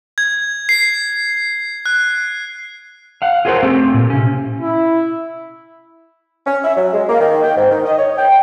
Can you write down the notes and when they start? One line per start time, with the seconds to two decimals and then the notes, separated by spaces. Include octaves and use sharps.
0.18 G#6
0.69 C7
1.86 F#6
3.22 F5 F#5
3.45 F4 G#4 A#4 C5 C#5 F#5
3.63 A3 C4 G4
3.94 A#2
4.10 C3 C#4
4.61 E4
6.47 C#4
6.64 E5
6.77 F#3
6.93 G#3
7.09 A#3
7.21 D#3
7.43 G5
7.57 G#2
7.71 D#3
7.86 D#5
7.99 C#5
8.18 G5